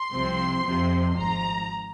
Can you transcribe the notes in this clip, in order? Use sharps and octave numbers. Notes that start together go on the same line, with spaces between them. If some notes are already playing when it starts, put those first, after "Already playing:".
Already playing: C6
C2 C3 F3 C4
F2 C3 F3 C4
G#1 G#2 F3 A#5